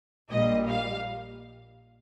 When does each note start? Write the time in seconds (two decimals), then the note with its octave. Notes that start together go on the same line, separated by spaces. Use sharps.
0.31 A#1 A#2 G3 D#5
0.69 F5